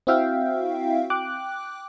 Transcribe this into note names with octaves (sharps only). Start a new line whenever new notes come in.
C4 E4 F#4 E5 F5 G5
G5 D6 F#6